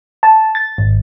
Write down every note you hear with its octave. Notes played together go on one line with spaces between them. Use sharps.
A5
A6
G#1